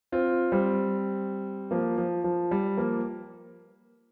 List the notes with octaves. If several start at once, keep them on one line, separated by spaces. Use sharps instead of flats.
C4 F4
G3 C4
F3 A#3
F3
F3
G3
F3 A#3